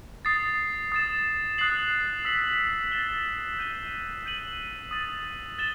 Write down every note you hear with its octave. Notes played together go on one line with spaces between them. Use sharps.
D#6 A6 C7
D#6 A6 E7
D#6 F#6 C7 F#7
E6 B6 F#7
A6 E7 G7
G6 D#7 G7
G6 D#7 F#7
D#6 A6 D#7 F#7
A6 E7 G7